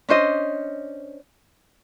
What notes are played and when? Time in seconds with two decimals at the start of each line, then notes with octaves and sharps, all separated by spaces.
0.09 C#4 D4 C5 D#5